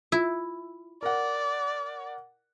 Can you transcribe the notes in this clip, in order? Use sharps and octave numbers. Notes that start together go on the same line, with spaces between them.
E4 F4
A#4 D5 F#5